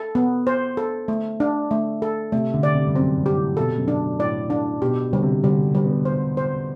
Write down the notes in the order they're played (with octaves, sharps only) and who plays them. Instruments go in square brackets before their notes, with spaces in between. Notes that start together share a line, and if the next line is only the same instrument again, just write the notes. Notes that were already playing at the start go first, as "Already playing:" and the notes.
Already playing: [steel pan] A4
B3
C5
A4
A3
D4
A3
A4
[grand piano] C3 [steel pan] A3
[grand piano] D3
[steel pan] D5
[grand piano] C3
G2
[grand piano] F#2 [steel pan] C4
[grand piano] G2
[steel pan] G4
[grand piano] A2
[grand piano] B2 [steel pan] A4
[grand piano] F#2
[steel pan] D4
[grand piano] A2 [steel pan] D5
[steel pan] D4
[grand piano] B2 [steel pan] G4
[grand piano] D3 [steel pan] G3
[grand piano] C3
[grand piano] D3 [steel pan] G3
[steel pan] G3
[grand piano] B3
[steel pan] C5
C5